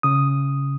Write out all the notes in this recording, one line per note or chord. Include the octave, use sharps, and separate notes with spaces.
C#3 D#6